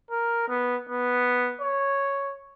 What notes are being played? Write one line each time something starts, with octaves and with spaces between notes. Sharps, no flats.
A#4
B3
B3
C#5